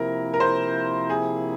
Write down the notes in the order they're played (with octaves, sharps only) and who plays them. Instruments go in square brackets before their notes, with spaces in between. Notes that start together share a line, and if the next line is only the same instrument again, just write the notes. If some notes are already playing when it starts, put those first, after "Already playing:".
Already playing: [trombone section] C3 F3 A#3 E4 [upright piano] A#4
[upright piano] A#4
C5
G#4